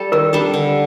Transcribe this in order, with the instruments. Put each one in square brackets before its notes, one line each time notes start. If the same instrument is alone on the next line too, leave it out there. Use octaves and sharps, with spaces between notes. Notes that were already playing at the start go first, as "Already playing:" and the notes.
Already playing: [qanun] G3 A4
[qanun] D#3 [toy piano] A#4
[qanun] G3 D4 A4
D3